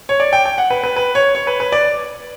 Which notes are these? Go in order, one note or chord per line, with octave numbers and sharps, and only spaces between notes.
C#5
D5
G5
G5
F#5
B4
B4
B4
C#5
C#5
B4
B4
D5